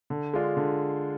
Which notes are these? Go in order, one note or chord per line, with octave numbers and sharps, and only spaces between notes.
D3
G#3 D4 F4
D3